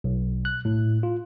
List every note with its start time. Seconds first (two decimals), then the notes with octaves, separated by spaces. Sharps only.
0.04 B1
0.45 F#6
0.65 A2
1.03 F4